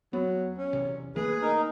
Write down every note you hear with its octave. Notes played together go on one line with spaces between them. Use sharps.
E2 F#3 B3
C#4
B1 E2 C3
D#3 A3 A#3 G#4 B4
D#4 A#4